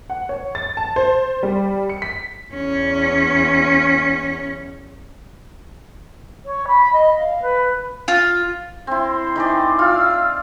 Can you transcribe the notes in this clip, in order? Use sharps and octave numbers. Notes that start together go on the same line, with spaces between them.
F#5
C#5
A6
A5
C5
G3
C#7
B6
E2 C#4
C#5
B5
D#5
F5
B4
F4
C4 E4 C6
D#3 E3 D5
F4 F5 E6 F6